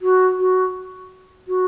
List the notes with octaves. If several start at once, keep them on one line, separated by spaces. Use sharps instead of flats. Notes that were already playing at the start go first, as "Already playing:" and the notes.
F#4
F#4
F#4